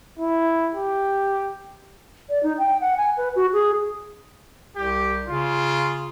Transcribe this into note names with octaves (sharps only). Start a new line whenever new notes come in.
E4
G4
D5
D#4
G5
F#5
G#5
B4
F#4
G#4
C2 G4
C#3 F4